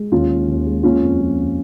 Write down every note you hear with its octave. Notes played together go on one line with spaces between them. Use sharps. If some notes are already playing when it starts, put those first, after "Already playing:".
Already playing: G#3
D#2 C#4 F4
G#3
D#2
G#3
A#3 C#4 F4
F2
F3
F2